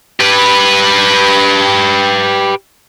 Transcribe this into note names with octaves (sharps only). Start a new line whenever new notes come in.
G4 B4